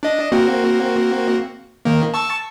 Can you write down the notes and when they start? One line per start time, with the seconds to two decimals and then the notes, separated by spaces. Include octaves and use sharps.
0.03 D4 D#5
0.32 A#3 C4 F#4
1.85 D#3 A#3
2.14 A5 C#6 E6